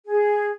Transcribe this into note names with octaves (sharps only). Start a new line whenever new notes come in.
G#4